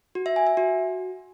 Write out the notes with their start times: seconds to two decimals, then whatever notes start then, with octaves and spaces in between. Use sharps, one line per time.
0.15 F#4
0.26 E5
0.36 G#5
0.47 E5
0.57 F#4